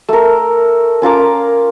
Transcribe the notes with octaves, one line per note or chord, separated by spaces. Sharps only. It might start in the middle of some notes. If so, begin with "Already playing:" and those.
A3 A#4
C#4 F4 A#4 D6